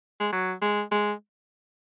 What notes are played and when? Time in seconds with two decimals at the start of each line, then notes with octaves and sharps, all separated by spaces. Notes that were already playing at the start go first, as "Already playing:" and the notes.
0.20 G#3
0.33 F#3
0.61 G#3
0.91 G#3